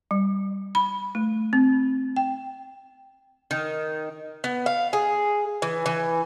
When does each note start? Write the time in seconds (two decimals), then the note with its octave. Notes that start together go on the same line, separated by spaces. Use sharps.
0.11 G3
0.75 B5
1.15 A3
1.53 C4
2.17 G5
3.51 D#3
4.44 B3
4.66 F5
4.93 G#4
5.62 E3
5.86 E3